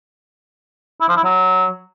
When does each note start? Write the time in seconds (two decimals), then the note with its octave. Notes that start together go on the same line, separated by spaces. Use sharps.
1.01 E4
1.08 F3
1.16 E4
1.24 F#3